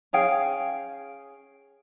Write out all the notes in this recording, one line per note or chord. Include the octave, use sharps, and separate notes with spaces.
C#4 G#4 F5 G5